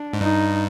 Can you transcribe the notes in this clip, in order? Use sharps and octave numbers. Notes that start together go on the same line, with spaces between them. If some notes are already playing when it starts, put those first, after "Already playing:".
Already playing: D4
G#2
G2 D#4